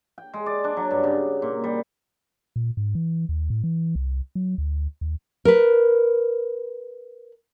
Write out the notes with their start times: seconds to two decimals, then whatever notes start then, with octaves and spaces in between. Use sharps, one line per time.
0.18 G5
0.34 G#3
0.46 D5
0.64 D4
0.77 F#3
0.91 G2
1.03 C#3
1.42 A#2
1.64 G3
2.56 A#2
2.77 G#2
2.95 E3
3.29 D#2
3.50 A2
3.64 E3
3.95 C2
4.35 F#3
4.58 D2
5.01 D#2
5.45 A#4 B4